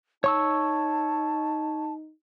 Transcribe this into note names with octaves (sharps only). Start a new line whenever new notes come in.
D#4 C#5 A5 C#6 E6